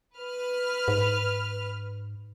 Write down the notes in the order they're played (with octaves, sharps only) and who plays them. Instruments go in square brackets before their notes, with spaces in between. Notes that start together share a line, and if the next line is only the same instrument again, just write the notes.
[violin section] B4 F6
[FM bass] G#2